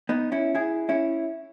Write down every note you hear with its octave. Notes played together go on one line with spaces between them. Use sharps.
B3 D#4
C#4 E4
E4 G#4
C#4 E4